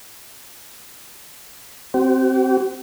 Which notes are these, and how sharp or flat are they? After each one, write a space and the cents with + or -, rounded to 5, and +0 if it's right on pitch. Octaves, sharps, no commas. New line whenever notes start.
C4 +0 G4 -45